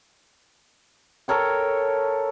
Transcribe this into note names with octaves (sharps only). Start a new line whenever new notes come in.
A4 A#4 C#5 G5